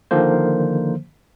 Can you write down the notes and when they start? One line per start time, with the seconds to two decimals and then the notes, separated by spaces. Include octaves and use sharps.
0.11 D3 D#3 F3 A#3 C5